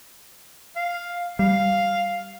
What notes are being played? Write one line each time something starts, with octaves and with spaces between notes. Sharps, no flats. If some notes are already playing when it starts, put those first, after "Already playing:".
F5
G3 F5